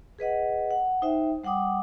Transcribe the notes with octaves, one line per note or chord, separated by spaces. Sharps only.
G#4 B4 D#5 F#5
F#5
D#4 C5 E5 G5
G3 F#5 G5 D6 D#6